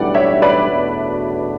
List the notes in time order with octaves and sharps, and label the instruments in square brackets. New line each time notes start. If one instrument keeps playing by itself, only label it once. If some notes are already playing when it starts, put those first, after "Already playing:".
Already playing: [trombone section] B1 A2 E3 G3 D4 [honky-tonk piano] D5 F#5
[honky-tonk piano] C#5 E5
B4 D5
[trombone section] E2 B2 A3 D4 F#4